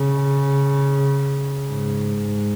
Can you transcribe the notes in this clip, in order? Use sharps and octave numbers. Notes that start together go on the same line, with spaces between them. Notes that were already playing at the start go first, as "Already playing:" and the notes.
Already playing: C#3
G#2